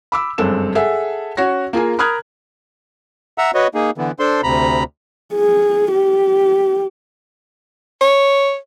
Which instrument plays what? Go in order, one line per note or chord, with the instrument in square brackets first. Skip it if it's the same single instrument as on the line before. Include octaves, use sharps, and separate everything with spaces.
[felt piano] B5 D6 E6
F#1 G2 G#3 C4 A4 E7
G#4 A4 E5 F#5
C#4 F#4 C#5 A#6
A#3 F4 G#4 G#5
A#4 B5 D#6 F6 F#6 G#6
[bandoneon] E5 F#5 A#5 E6
F#4 B4 C#5 D#5
A#3 D#4 G#4
D3 E3 B3
D4 A4 C5 C6
D2 C3 A#5 B5
[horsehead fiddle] G#4
G4
[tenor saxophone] C#5